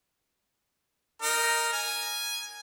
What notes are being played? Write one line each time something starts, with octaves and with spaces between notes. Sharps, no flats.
D#4 A#4
G#5